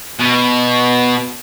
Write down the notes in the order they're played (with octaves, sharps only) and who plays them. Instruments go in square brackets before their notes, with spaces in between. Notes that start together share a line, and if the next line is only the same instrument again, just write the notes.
[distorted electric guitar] B2